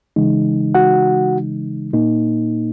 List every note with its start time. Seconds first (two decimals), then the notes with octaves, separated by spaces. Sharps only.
0.16 C#3 E3 G#3 D#4
0.75 F#4 F#5
1.93 A#2 A#3 D#4